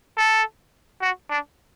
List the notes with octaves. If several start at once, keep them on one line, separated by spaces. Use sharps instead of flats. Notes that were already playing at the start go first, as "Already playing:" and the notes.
A4
F#4
D4